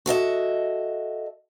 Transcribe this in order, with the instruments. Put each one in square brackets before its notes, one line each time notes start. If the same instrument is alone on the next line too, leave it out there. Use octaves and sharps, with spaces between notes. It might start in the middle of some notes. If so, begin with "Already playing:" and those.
[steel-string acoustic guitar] F#4 A4 D#5 E5